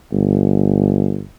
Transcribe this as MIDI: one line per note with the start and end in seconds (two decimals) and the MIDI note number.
0.12 1.22 31